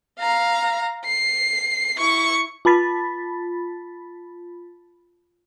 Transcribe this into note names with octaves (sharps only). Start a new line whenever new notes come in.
F5 A#5
C7
E4 C#6
F4 A5 B5 A6 B6